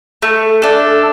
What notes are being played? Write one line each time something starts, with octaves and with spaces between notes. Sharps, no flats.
A3
D4 A4